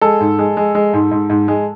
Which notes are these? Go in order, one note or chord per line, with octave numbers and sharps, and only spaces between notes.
G#3 A4
G#2
G#3
G#3
G#3
G#2
G#2
G#2
G#3